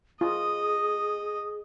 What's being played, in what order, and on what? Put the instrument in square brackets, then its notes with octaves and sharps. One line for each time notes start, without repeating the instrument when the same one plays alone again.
[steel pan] F4 [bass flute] G#4 [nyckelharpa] D#5